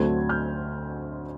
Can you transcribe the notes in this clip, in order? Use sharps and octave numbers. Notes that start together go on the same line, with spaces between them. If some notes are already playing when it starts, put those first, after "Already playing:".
Already playing: D2 D3 F#3 A3 C4 G#6
F6 G6